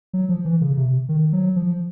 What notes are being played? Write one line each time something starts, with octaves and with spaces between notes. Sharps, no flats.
F#3
F3
E3
C#3
C3
D#3
F#3
F3